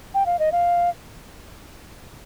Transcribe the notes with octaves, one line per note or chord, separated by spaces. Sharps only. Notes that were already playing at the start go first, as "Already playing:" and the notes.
G5
F5
D#5
F5